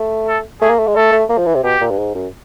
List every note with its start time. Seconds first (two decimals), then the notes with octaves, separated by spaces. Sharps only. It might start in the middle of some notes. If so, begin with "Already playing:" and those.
Already playing: A3
0.28 A4
0.61 A3 G#4
0.70 A#3
0.79 A3
0.87 G#3
0.96 A3 A4
1.12 A3
1.30 A#3
1.38 F3
1.46 E3
1.55 C3
1.64 B2 G4
1.81 A#2
1.91 G2
1.98 G#2
2.15 F#2